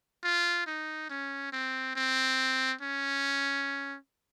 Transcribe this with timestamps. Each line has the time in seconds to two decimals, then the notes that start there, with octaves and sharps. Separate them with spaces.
0.24 F4
0.67 D#4
1.09 C#4
1.52 C4
1.95 C4
2.81 C#4